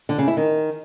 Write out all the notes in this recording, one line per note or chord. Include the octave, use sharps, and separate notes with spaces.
D3
C#3
E4
D#3